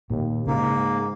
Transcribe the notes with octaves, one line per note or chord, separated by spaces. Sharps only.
D#2 A#2
G#2 C#3 A#3